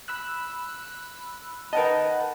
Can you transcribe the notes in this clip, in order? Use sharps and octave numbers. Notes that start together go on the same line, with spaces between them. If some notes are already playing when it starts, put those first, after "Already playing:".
B5 E6 F#6
A#4 B4 D#5 F#5 A5